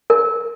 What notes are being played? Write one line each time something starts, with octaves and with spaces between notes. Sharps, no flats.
A#4